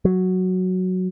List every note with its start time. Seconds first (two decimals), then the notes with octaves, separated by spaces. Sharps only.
0.05 F#3